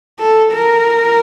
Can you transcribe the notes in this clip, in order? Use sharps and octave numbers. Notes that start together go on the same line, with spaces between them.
A4
A#4